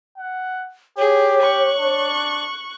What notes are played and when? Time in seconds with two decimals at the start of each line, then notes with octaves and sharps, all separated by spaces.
0.18 F#5
0.98 G4 G#4 C#5
1.41 C#6 F#6
1.80 D4